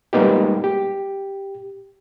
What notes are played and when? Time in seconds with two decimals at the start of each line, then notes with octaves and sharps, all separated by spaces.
0.13 G3 G#3 A#3 B3 D#4 G4
0.64 G4